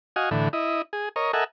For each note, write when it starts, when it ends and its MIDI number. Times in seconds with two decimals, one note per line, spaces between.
0.16 0.30 66
0.16 0.30 75
0.16 0.30 77
0.16 0.30 80
0.31 0.49 45
0.31 0.49 50
0.31 0.49 52
0.53 0.82 64
0.53 0.82 75
0.93 1.09 68
1.16 1.32 70
1.16 1.32 73
1.16 1.32 75
1.33 1.44 69
1.33 1.44 70
1.33 1.44 75
1.33 1.44 76
1.33 1.44 78
1.33 1.44 80